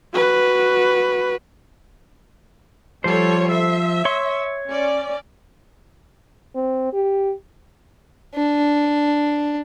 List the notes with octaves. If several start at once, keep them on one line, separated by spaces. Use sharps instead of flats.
F#4 B4
F3 G3 A4 C5 C#5
E5
C#5 C6
C#4 D5
C4
G4
D4